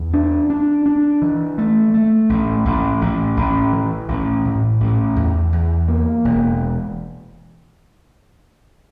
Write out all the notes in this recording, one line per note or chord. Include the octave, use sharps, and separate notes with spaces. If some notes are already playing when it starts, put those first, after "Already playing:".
Already playing: E2
D4
D4
D4
E3
A3
A3
A1
A1
A1
A1
E3
A1
A2
A1
E2
E2
A#3
E1